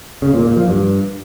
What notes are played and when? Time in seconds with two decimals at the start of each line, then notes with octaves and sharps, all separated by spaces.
0.22 C#3
0.34 A#2
0.45 A#2
0.57 F3
0.68 G2